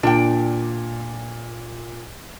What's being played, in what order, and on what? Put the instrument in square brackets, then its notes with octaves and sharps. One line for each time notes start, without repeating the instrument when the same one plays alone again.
[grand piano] A#2 [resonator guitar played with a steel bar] D4 G5